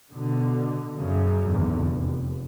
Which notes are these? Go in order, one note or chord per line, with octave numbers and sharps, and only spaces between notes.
B2 D3
F#2 C#3
G#1 E2 D3
F1